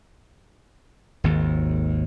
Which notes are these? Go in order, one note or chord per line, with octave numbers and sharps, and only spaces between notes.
G#1 D#2